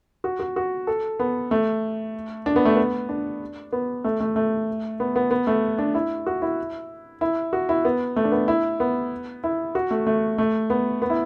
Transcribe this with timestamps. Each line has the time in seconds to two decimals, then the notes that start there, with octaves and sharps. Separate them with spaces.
0.24 F#4
0.40 F#4
0.56 F#4
0.87 A4
1.20 B3
1.51 A3
2.46 D4
2.56 B3
2.65 A3
2.75 B3
3.09 D4
3.73 B3
4.04 A3
4.20 A3
4.36 A3
5.00 B3
5.16 B3
5.31 B3
5.47 A3
5.78 D4
5.95 E4
6.26 F#4
6.42 E4
7.21 E4
7.53 F#4
7.69 E4
7.85 B3
8.16 A3
8.24 D4
8.32 B3
8.48 E4
8.80 B3
9.44 E4
9.75 F#4
9.91 A3
10.06 A3
10.38 A3
10.70 B3
11.02 B3
11.10 E4